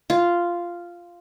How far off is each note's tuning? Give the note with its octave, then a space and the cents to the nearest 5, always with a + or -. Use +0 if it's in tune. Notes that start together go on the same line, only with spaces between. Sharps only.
F4 -5